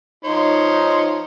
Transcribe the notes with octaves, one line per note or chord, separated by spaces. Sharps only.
F3 D#4 C#5 C6